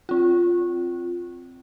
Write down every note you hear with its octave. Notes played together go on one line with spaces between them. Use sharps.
C4 F4